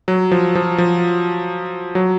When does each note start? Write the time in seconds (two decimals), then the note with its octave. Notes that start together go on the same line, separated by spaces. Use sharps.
0.08 F#3
0.32 F3
0.55 F3
0.78 F3
1.95 F#3